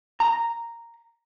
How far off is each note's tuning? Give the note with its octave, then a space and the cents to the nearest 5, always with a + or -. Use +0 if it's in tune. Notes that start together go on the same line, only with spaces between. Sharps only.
A#5 -5